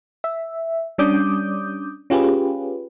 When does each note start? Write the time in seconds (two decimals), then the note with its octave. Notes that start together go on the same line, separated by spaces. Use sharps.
0.24 E5
0.98 G3 C#4 D4 D6 D#6 G6
2.10 C#4 F4 G4 G#4 B4